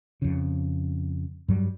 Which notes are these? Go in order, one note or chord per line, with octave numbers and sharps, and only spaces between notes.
F2 C#3
G2 F#3 G3